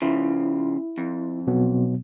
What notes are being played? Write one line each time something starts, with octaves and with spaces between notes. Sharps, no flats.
C#3 F3 E4
F2
B2 F#3 B3